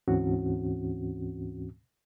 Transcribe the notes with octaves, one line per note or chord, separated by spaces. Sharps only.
D2 G#2 E3 C4 C#4 F#4